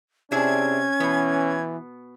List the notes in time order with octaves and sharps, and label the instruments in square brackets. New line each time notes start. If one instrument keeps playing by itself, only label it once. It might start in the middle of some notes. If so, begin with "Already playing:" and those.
[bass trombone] C3 [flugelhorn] C#4 [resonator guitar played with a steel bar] D4 E4 G#4 [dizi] G#6
[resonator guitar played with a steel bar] B2 B3 [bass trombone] E3